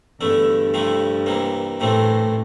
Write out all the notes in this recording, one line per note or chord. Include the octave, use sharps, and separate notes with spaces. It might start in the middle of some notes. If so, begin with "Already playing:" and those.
E2 G2 D3 A3 E4
C3 F3 A3 E4
C2 C3 E3 A#3
C2 A2 C3 E3 A3 C4